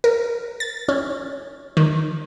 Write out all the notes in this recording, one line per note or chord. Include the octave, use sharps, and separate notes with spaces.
A#4
A6
C#4
D#3